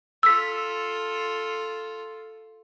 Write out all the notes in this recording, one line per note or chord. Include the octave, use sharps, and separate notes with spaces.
F4 A4 E6 B6